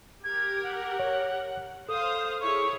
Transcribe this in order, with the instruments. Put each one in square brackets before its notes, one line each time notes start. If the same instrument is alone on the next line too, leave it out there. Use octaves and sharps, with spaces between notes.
[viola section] G4 A#4 [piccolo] G#6
[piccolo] F#5
[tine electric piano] C#5
[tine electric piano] A4 [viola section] C5 F5 [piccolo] D#6
[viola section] E4 G#4 C#5 [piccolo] C#6